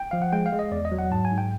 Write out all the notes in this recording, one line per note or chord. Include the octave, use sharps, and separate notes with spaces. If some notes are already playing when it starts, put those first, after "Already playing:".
Already playing: G5
F3 F5
F#5
G#3 G5
F5
G#3
D#5
E2 D5
D#5
F#3
F#5
G#2 A5
G#5
G#2
G5